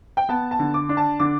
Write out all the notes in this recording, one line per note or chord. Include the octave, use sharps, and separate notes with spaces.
G5
B3 A5
A5
D3
D6
D4
A5
D3 D6